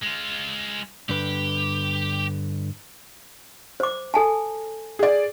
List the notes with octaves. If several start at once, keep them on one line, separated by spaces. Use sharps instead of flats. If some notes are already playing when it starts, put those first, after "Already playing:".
G#3 F4
G2 D3 G4 B4
C5 D6
A4 G#5 A5
G#4 D5